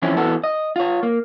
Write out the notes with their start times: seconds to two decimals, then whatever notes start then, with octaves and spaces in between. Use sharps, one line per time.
0.02 E3 F3 C4 C#4 E4
0.17 E3 B3 F#4 A4
0.44 D#5
0.76 F4 C#5
1.03 A#3